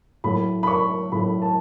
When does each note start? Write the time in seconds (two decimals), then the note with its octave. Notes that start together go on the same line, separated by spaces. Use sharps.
0.24 A2 F#3 A3 B5
0.63 B5
0.67 C#6
1.12 A2 F#3 A3 B5
1.42 A5